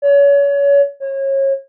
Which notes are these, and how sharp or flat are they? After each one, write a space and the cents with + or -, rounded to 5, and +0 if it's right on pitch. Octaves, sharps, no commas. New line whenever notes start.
C#5 +30
C#5 -30